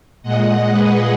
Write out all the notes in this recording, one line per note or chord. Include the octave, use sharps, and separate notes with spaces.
A#2 G#3 D#5 F#5
G#4 B4